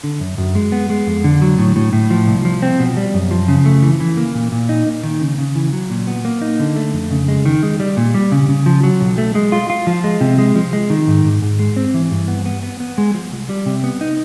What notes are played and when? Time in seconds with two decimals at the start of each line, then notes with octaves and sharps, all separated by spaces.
0.04 D3
0.20 F#2
0.38 F#2
0.55 G#3
0.72 B3
0.90 G#3
1.07 F2
1.24 D3
1.42 F#3
1.59 A2
1.76 A2
1.93 A2
2.10 F3
2.27 C2
2.45 F3
2.62 C4
2.80 B2
2.97 G3
3.14 F#2
3.31 F3
3.48 C#3
3.66 A3
3.82 E3
4.00 E3
4.17 A#3
4.35 A#2
4.52 A#2
4.69 D#4
4.86 A#3
5.04 D#3
5.21 C#3
5.38 C#3
5.55 E3
5.73 F#3
5.90 A#2
6.07 B3
6.25 A#3
6.41 D#4
6.60 D3
6.76 A3
6.93 F2
7.11 C#3
7.28 G#3
7.45 D#3
7.63 G#3
7.80 G3
7.97 A#2
8.14 G3
8.32 C#3
8.49 C#3
8.66 F3
8.83 F#3
9.01 B1
9.18 A3
9.35 G#3
9.52 F4
9.70 F4
9.87 F3
10.04 G#3
10.21 C3
10.38 G#3
10.56 F3
10.73 G#3
10.90 D#3
11.08 G#2
11.25 G#2
11.42 G#2
11.59 G#3
11.76 C4
11.94 E3
12.11 G2
12.28 B3
12.46 B3
12.63 B3
12.80 B3
12.98 G#3
13.14 F3
13.32 C2
13.49 G3
13.66 C3
13.84 B3
14.01 D#4